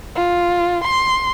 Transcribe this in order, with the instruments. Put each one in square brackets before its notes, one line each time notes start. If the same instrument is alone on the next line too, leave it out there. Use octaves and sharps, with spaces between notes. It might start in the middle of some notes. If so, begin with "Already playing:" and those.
[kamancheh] F4
C6